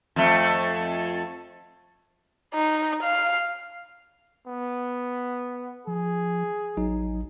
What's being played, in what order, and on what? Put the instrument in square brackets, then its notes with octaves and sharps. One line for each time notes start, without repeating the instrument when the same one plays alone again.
[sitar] F2 A3
[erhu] D#4
F5
[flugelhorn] B3
[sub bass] F3 [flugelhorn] G#4
[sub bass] A1 [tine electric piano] F#3 D#4